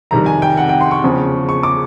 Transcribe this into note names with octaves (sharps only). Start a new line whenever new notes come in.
F2 C3 D#3 G3 A#5
G#5
G5
F#5
G5
C6
C#6
E2 C#3 F3
C#6
D6